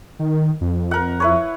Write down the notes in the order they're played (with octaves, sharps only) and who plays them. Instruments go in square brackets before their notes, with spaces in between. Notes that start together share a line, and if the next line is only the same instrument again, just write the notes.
[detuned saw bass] D#3
F2
[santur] A#4 F#5
E4 B4 C#5